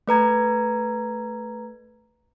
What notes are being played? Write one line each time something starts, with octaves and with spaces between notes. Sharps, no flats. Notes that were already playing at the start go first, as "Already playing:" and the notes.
A3 B4 A#5 G#6